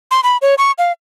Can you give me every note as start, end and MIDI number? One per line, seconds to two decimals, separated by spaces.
0.11 0.20 84
0.23 0.37 83
0.42 0.55 73
0.58 0.72 85
0.78 0.92 77